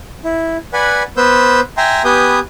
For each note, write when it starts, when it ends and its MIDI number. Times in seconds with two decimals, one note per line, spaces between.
0.24 0.57 64
0.73 1.03 71
0.73 1.03 74
0.73 1.03 78
0.73 1.03 80
0.73 1.03 83
1.17 1.60 59
1.17 1.60 71
1.17 1.60 72
1.17 1.60 88
1.17 1.60 91
1.77 2.03 76
1.77 2.03 79
1.77 2.03 80
1.77 2.03 82
1.77 2.03 84
2.05 2.39 59
2.05 2.39 67
2.05 2.39 71
2.05 2.39 80
2.05 2.39 87
2.05 2.39 91